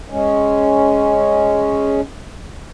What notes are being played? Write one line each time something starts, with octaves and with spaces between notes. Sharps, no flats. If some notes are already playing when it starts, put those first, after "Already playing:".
G#3 C#4